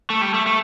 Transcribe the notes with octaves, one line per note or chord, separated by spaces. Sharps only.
A3
G3
A3
A3